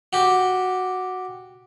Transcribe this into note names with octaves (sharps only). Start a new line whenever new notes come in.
F#4 G4